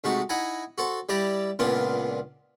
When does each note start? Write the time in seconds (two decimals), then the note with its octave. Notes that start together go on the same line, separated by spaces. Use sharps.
0.04 G#2 C3 A3 D#4 F#4
0.29 D#4 E4 F#5 G#5 A#5
0.78 F#4 A4 C5
1.09 G3 E4 G4 D5 A#5
1.59 C#2 A#2 A#3 B3 D4 C5